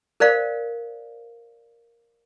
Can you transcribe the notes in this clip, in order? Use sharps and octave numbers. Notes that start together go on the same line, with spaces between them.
A#4 C5 D5 F5